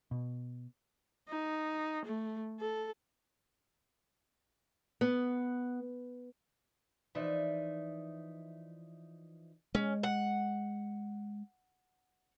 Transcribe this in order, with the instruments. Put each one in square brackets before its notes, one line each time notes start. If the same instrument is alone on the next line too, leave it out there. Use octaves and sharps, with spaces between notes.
[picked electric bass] B2
[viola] D#4
A3
A4
[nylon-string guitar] B3
[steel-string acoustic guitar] E3 F3 D#4 D5 E5
[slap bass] G#3 [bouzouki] C#4
[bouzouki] F#5